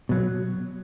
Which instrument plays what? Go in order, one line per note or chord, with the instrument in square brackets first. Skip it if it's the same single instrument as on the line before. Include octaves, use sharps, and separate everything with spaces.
[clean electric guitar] B2 F#3